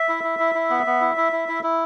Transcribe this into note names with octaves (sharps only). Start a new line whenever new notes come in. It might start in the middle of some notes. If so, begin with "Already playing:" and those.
Already playing: E5
E4
E4
E4
E4
B3
B3
E4
E4
E4
E4
E4